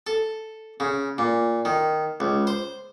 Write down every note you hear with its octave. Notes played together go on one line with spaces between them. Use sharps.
A4
C#3
A#2
D#3
C#2
C5